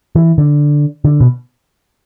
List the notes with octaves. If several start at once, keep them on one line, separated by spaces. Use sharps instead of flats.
E3
D3
D3
B2